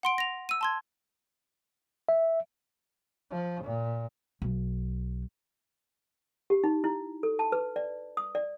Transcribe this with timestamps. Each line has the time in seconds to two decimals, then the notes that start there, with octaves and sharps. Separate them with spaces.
0.03 F#5 C6 D7
0.18 A#6 F7
0.49 E6 D#7
0.61 A5 C6 G#6
2.09 E5
3.31 F3
3.63 A#2
4.42 B1
6.50 G4
6.64 D#4
6.84 E4
7.23 A4
7.39 A5
7.52 B4
7.76 D5
8.17 D#6
8.35 D5